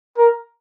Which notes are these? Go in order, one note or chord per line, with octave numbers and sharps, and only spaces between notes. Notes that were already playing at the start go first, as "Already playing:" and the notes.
A#4